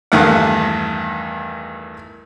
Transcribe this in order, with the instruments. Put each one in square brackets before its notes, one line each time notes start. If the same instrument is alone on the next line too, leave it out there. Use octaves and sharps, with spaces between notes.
[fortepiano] E2 G2 D#3 A3 F5 F#5